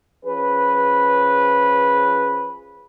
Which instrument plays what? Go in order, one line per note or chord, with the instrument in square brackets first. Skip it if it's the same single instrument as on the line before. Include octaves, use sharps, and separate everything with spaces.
[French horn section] F3 C#4 G#4 B4